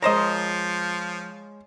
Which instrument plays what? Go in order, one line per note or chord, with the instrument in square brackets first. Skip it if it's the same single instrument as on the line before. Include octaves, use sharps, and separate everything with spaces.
[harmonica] F3 [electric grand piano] G#3 C#5 [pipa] A#4 C5 D#5